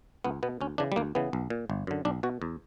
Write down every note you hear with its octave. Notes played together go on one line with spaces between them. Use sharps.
C#2 B3
B2 B3
D2 C#4
C#3 E3 D4
G3
D2 A#3
C#3 E3 B3
B1
A#2
G1
F#2 D3
B1 D4
B2 F#4
E2